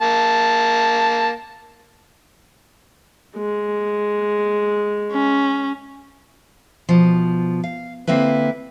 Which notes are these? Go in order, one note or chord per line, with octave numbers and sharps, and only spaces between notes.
A#3 A5
G#3
C#4
B2 F3
F5
D3 A#3 C4 E4 B4